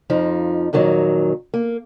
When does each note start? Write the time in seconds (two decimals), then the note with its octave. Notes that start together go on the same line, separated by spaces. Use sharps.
0.10 F2 F3 D#4
0.73 F2 A#2 D#3 F#3
1.54 A#3